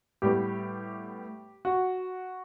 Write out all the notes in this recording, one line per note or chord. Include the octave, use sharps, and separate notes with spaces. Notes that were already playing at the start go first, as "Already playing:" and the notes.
A2 G3 B3 G4
F#4